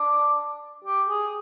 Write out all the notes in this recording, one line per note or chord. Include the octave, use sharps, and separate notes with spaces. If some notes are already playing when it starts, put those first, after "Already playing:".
Already playing: D4
G4
G#4